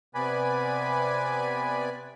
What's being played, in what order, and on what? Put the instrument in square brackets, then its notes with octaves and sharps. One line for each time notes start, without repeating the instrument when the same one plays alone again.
[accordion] C3 B3 B4 D5 G#5 B5